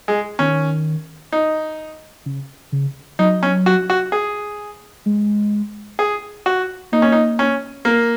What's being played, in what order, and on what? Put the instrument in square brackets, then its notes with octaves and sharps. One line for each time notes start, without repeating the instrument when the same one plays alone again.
[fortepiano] G#3
[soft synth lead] D#3 [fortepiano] C#4
[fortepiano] D#4
[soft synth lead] C#3
C#3
[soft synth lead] F#3 [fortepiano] D#4
[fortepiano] C#4
F#4
F#4
G#4
[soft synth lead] G#3
[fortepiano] G#4
F#4
[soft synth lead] A#3 [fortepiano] D#4
[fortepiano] C#4
D#4
C#4
A#3